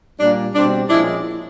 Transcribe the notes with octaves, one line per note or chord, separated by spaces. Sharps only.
A#2 G3 A#3 D4
B2 G3 C4 D4
A#2 F3 G#3 C#4 D4 E4